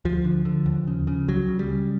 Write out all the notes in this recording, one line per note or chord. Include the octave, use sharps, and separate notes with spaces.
D2 F3
D3
D3
D#2
C#3
C#3
C#2 F#3
C#3
G3
C#3